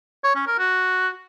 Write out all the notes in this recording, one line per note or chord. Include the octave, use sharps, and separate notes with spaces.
C#5
C#4
A#4
F#4